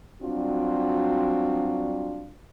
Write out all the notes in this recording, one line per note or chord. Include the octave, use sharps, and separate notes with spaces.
F#3 G3 C4 D4 F4 F#4